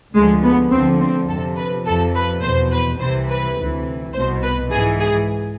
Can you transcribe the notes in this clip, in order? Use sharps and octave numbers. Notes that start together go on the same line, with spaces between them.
D2 D3 F3 G#3
B3
D2 D3 F3 C4
C4
F2 C3 F3 A4
B4
F2 C3 F3 A4
B4
E2 B2 C5
B4
C2 C3 E3 C5
B4
D2 C3 E3
C2 B2 C5
B4
G#2 E3 G#4
G#4